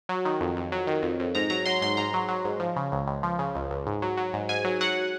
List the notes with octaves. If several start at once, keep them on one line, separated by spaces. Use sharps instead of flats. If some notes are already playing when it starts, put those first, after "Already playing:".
F#3
D#3
F2
F2
F#3
D#3
F2
F2
G#2 A#5
F#3 A#5
F#3 C6
G#2 C6
G#2 A#5
F#3
F#3
G#2
F3
C#3
C#2
C#2
F3
C#3
C#2
C#2
G#2
F#3
F#3
G#2
G#2 G#5
F#3
F#3 F#5